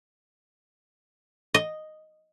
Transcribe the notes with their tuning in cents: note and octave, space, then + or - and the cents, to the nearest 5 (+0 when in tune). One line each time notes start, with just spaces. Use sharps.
D#5 -5